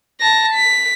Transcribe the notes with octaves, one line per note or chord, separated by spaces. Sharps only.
A5 A#6
B6